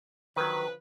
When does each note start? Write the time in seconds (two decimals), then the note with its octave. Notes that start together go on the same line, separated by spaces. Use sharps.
0.36 D3 D#3 F3 F#3 B4